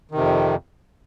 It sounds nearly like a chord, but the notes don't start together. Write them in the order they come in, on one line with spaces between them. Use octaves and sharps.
D#3 C3 F2